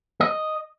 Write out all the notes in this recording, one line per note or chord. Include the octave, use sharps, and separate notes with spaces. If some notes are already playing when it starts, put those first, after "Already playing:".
D#5